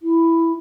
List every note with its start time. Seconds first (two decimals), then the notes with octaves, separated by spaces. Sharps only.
0.01 E4